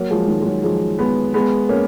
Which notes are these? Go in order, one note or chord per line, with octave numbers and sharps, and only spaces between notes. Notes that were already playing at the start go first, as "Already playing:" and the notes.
Already playing: F#3 A#3
F3 G#3
D#3 F#3
G#3
D#3 F#3
F3 G#3
G#3 B3
G#3 B3
A#3 C#4